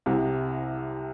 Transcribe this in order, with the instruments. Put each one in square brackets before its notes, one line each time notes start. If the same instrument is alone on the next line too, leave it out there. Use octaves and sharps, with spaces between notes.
[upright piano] C2 C3